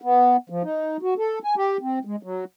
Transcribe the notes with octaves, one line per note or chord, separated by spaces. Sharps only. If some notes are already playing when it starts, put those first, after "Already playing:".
B3
F3
D#4
F#4
A4
G#5
G4
C4
G#3
F#3